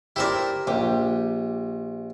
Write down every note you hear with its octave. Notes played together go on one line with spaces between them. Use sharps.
E4 G4 A#4 C5 D5
A#1 G4